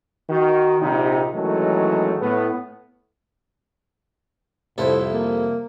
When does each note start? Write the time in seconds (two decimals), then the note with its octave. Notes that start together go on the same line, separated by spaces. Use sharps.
0.30 D#3 F#4
0.81 A#1 C3 D#4
1.35 D#3 E3 F#3 G#3 A3 C#4
2.21 A2 B3
4.78 C2 F2 A2 E4 A4 C5 E5
5.12 A#3